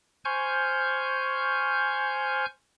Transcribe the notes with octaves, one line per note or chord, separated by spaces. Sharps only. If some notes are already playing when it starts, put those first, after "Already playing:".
C5 G#5 C#6 F6 G6